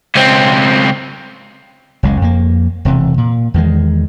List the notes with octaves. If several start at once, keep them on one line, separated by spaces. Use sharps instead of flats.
C#2 C4
F#1 C#2 G#3
F2 A#3
E1 C3 E3
A#2
E2 D#3 G#3